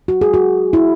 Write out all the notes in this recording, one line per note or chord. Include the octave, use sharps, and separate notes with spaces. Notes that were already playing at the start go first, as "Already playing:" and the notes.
F#4
G#4
F#4
E4